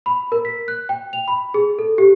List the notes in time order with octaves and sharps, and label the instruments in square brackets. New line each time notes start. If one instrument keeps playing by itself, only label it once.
[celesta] B5
A#4
B6
F#6
G5
F7
B5
G#4
A4
G4